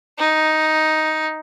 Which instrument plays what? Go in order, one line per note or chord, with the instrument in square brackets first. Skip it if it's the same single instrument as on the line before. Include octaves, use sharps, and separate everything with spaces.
[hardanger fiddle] D#4